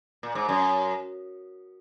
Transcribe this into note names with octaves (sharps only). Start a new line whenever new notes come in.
A#2
G#2
F#2